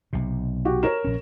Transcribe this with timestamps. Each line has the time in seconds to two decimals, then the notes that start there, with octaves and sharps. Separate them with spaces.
0.13 B1 C3
0.65 F#4 G4
0.83 A#4 C#5 E7
1.05 A#1 C#4